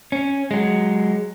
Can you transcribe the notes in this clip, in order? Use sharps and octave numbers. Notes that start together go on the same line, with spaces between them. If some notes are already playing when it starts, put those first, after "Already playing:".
C#4
F#3 G#3